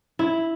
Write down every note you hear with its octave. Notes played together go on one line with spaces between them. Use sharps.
E4